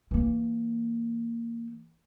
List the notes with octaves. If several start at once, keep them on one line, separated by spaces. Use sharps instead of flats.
E3 A#3